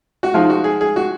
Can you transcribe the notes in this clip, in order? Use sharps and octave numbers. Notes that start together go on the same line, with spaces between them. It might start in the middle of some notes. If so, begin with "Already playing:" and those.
F#4
F3 G#3 D#4 F4
F#4
G#4
G#4
F#4